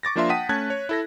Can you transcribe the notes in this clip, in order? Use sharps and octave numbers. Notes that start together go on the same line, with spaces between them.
C#6 D6 A6 A#6
F3 A#3 D4 F4 E5 C6
F#5 G5 A5 D#6 B6 D#7
A3 C#4 A5 F#6 G#6
C#5
E4 A4 A#6